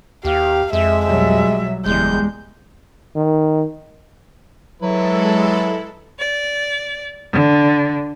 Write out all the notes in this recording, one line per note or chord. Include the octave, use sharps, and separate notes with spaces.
D#2 G4 F5
F2 G#3 E5
B1 F#3 G3 E5
F#1 E2 G3 G#3 G6
D#3
F#3 G#3 E4 A4 B4
D5
D3